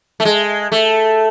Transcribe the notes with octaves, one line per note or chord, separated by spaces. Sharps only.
A3
G#3
A3